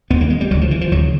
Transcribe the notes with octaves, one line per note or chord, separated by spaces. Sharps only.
D#2 D3 B3
A#3
G#3
G3
D2 C#3 F#3
F3
E3
F3
D2 C#3 F#3